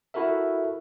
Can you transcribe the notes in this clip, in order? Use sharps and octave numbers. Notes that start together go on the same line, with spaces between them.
E4 F#4 A4 A#4 E5